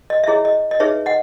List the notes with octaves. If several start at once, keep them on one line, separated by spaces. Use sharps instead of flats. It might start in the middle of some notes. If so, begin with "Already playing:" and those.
D#5
E5
E4 G#4 C#5 D#5
D#5
D#5
D#4 G#4 B4 C#5 E5
D#5 F#5